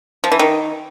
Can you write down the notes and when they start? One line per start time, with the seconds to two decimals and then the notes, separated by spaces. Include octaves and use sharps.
0.24 F3
0.32 E3
0.39 D#3